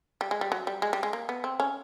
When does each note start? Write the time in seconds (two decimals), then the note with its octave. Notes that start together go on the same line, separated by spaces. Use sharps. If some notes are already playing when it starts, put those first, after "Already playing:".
0.21 G3
0.31 G#3
0.41 G3
0.52 F#3
0.67 G3
0.82 G#3
0.93 G3
1.03 G#3
1.13 A#3
1.29 B3
1.44 C4
1.60 C#4